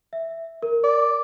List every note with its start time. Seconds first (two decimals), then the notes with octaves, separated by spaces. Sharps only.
0.13 E5
0.63 A#4
0.84 D5